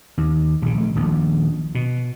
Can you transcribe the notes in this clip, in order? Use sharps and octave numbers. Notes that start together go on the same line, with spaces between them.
D#2
A#1 C#3
A#1 A3
D#1 A#1
B2